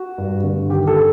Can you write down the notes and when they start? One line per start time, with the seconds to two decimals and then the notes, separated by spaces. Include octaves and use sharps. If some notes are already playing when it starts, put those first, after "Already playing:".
Already playing: F#4
0.18 G2
0.44 D3
0.70 D#3 G4
0.87 A4